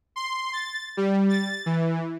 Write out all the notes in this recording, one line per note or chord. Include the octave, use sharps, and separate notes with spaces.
C6
A6
G3
A6
E3